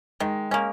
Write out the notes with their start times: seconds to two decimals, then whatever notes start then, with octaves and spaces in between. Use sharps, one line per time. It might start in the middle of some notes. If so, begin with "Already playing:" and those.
0.20 D#3 G#3
0.51 G#3 A#3 C#4